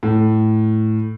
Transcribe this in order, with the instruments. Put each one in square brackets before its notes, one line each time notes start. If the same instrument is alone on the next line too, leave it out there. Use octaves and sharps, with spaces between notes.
[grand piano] A2